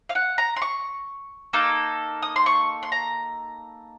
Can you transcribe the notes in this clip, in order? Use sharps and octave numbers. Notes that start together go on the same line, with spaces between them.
F5
F#5
A#5
C6
C#6
A#3 D#4 A4
D#6
C6
C#6
C6
A#5